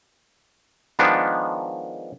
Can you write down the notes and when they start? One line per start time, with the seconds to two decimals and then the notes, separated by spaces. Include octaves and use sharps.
0.99 D#3 F3 G#3 B3 D4